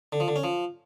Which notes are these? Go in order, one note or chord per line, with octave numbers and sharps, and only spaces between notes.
D3
F3
D3
C#4
F3